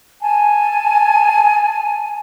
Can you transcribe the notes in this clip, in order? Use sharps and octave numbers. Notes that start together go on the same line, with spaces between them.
G#5 A5